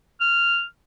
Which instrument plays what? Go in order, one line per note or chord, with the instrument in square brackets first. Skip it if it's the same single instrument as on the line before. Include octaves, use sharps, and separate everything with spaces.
[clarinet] F6